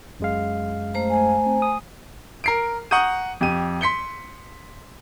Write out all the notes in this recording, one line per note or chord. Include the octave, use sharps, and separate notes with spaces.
F#2 G#3 F5
A3 C5 A#5
G#5
C4
D#6
A#4 C7 D7
F#5 A#5 C#6 D#6 G6 D#7
F2 G4 D#7
C6 B6 C#7 G7